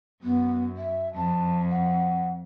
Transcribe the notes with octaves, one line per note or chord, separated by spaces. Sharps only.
F#2 B3
E5
F2 A5
F#5